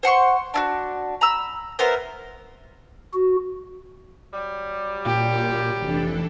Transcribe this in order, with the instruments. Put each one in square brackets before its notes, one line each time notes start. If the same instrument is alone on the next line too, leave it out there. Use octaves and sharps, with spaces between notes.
[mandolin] C5 F#5 C6 C#6
D4 E4 F#4
A#5 B5 E6
B3 E4 A#4 C5
[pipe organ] F#4
[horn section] F#3 G3
[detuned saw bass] A#2 [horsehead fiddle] G4
[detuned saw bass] F1 [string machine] E3 D4 A4